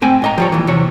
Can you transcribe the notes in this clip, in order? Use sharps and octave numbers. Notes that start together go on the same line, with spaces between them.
G#2 A3 C4 G5 G#5
G#2 D#5 A#5
F3 G3 C#5
D#2 E3
E2 C3 C#5